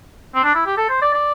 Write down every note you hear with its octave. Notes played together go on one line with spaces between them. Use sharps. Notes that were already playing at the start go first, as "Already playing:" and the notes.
C4
D4
E4
G4
A4
C5
D5
D5